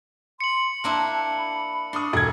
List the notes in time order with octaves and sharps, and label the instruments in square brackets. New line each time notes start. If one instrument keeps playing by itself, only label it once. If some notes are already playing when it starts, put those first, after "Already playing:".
[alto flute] C6 [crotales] C#7 F#7
[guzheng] A#3 D4 E4 [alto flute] A5
[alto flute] B5
[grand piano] D4 C#6 D#6 [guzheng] C6
[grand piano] E1 G#6 [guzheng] G#4 [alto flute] A4